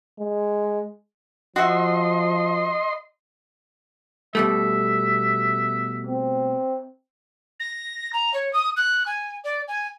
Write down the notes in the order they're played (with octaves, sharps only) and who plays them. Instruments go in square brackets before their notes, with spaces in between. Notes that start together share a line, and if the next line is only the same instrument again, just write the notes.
[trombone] G#3
[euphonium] F3 [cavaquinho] F#4 E5 [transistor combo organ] D#5 C6
[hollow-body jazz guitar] B2 G3 A3 [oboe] E5
[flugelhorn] C4
[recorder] A#6
A#5
C#5
D#6
F#6
G#5
D5
G#5